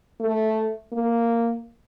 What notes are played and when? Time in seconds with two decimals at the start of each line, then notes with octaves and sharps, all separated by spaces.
0.20 A3
0.93 A#3